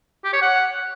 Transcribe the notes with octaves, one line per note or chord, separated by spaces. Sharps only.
G4
C#5
F#5